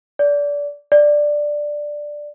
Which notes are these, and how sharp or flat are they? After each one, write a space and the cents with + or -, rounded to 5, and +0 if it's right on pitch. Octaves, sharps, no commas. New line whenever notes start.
D5 -25
D5 +5